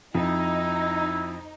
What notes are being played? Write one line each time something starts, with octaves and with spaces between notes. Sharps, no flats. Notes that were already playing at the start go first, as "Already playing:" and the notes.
F2 D#4 E4